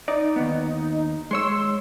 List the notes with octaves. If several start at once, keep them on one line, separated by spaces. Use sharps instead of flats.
D#4 D5
D#2 B3
G#3 C#5 C6 E6